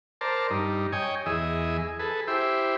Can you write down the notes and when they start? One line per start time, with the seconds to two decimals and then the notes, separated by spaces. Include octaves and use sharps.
0.21 A#4 C5 D5 A5
0.50 G2 D#4
0.92 C#5 D#5 G5 G#5
1.26 E2 G#4 D#5 E5
1.99 G#4 A4 B4
2.28 E4 G4 C5 E5